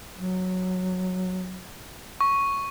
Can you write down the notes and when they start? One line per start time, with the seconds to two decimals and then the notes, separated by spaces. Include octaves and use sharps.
0.17 F#3
2.21 C#6